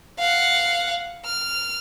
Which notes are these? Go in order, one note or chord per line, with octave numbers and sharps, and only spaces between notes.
F5 F#5
F6